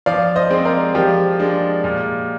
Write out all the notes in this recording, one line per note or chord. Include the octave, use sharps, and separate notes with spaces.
F3 D5 F5
C5 D#5
G#3 C4
A#4 D5
F3 G4 A#4
G#3 D4
A#2